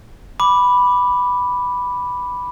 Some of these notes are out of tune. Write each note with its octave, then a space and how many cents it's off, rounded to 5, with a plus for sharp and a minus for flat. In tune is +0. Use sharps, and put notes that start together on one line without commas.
B5 +0 D6 +0